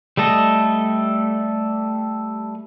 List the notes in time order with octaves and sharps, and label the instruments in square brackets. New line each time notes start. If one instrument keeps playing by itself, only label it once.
[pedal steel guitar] G3 A3 A4 D#5